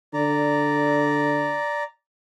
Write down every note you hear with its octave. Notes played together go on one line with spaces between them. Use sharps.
D3 D5 A#5